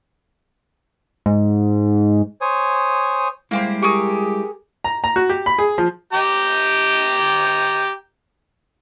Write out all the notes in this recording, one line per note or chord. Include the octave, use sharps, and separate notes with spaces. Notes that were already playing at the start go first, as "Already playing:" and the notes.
G#2
C5 C#5 G#5 D#6
G3 G#3 A#3 E4 G4 C5
G4 G#4 A#4 C#6
A#5
A#5
F#4
G4
B5
G#4
F3
G4 G5 A#5